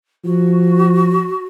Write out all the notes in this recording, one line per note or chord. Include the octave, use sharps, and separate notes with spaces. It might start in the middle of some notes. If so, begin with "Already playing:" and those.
F3 F#4